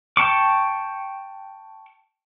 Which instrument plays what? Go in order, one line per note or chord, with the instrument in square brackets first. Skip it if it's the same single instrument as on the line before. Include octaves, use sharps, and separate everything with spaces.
[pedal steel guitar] G5 A5 C#6 D6